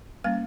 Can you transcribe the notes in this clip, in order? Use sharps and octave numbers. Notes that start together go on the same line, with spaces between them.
G3 A#3 C#4 F5